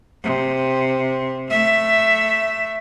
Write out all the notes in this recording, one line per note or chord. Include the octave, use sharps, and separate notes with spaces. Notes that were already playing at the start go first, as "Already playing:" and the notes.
C3
A3 E5